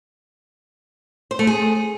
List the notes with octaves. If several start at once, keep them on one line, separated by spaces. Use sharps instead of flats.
C5
A3
G#4